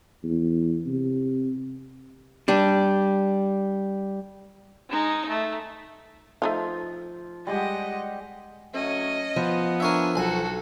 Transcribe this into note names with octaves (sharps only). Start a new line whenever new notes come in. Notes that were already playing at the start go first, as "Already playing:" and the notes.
E2
C3
G3 D4
G#3 D#4
A3
F3 A3 D#4 F4
G3 G#3 G4 D#5 F#5
F#3 A3 C#4 D#5
F3 B3
D4 A#4 C#5 E5 G#5
B1 F#4 A4 G#5